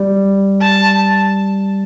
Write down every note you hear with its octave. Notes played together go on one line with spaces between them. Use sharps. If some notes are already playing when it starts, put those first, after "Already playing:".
Already playing: G3
A5